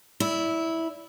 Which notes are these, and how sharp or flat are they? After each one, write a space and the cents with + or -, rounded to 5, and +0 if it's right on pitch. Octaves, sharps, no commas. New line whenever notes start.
E4 -10 D5 -25